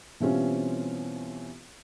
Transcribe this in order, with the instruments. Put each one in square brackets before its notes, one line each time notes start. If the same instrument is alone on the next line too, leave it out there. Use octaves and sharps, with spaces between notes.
[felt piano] B2 E3 G3 C4 C#4 F4